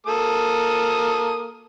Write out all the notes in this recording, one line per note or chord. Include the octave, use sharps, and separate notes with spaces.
A#3 A4 D#6